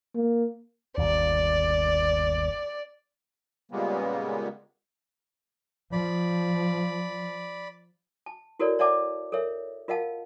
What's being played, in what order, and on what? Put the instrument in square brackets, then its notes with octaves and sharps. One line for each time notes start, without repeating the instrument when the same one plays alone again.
[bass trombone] A#3
[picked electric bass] G1 D#2 [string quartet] D5
[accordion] A#2 C#3 G3 G#3 A#3 B3
[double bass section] F3 [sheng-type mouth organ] D5 B5
[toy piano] A5
E4 F#4 A4 A#4 C#5 D5
C#5 D5 E5 F#5 A5 D6
A4 A#4 C#5 E5
F4 A#4 D#5 F5 F#5 A5